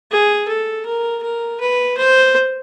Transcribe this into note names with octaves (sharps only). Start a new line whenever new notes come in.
G#4
A4
A#4
A#4
B4
C5